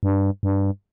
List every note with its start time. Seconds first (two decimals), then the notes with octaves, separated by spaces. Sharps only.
0.03 G2
0.43 G2